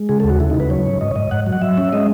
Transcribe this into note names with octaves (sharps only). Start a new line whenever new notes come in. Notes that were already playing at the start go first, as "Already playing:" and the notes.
Already playing: G#3
C#3 G#4
A4
D#2
F#4
C#3 E4
D#4
C#3
B4
F#3 C#5
G#2
G#2 D#5
C#5
G#2 D#5
G#2 F#5
F#3
F#5
F#3 E5
C#4
G#3 D#5